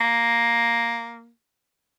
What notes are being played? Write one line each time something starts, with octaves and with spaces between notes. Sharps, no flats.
A#3